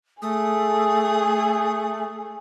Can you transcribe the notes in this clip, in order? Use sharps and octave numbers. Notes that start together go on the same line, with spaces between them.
A3 G#4 D#6